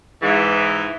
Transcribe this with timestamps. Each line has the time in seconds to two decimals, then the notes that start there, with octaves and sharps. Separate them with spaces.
0.22 G#2 E3